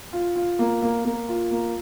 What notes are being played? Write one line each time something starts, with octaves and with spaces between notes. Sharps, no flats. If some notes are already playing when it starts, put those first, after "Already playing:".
F4
F4
A#3
A#3
A#3
F4
A#3